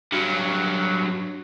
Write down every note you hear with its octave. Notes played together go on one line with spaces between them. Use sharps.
G2 F#3